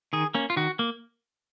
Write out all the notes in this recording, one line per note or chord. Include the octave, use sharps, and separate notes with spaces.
D#3 G#4
A#3 C#4
F4
D#3 F#4
A#3